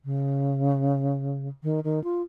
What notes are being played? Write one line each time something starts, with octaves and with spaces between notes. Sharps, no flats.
C#3
D#3
D#3
F4